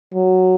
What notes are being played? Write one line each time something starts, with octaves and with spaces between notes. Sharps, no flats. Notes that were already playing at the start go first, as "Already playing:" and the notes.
F#3